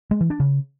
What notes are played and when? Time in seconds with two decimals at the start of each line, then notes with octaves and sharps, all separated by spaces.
0.11 G#3
0.21 E3
0.30 D4
0.40 C#3